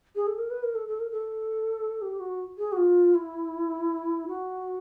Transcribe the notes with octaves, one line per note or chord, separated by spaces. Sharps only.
G#4
A4
A#4
B4
A#4
A4
A4
A#4
A4
G4
F#4
G#4
F#4
F4
E4
F#4